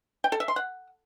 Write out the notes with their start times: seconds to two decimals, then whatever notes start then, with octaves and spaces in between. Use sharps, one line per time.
0.24 G5
0.32 A4
0.40 E5
0.48 C6
0.56 F#5